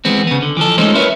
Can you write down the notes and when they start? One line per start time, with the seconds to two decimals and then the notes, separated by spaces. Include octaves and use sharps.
0.05 E3 G#3 B3 C4
0.27 C#3 B3
0.42 D3
0.57 E3 F3 A4
0.78 G#3 A3 C#4 D#4 F4 C5
0.94 C#4 E4 A#4 B4 C#5